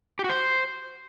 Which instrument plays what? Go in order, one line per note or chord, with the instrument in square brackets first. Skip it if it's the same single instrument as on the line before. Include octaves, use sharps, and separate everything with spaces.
[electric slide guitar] G4
F#4
C5